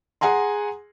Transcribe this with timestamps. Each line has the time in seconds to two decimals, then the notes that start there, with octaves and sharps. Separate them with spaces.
0.21 G#4 F#5 G#5 A#5 C6